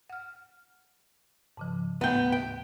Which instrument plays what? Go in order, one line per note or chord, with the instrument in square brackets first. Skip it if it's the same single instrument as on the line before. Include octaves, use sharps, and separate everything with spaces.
[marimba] F#5 F6
G#2 C#3 F3
[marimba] D#2 A2 A3 [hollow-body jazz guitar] B3 G5
[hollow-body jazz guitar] G5